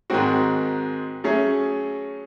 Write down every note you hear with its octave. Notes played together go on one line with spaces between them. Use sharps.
G#2 D#3 G#3 C4 F#4
F#3 A3 C#4 G#4